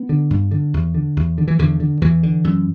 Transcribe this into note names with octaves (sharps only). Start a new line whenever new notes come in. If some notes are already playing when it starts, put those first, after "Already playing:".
Already playing: B3
D3
G2
D3
E2
D3
E2
D3
E3
E2 D3
D3
E2 E3
D3
F#2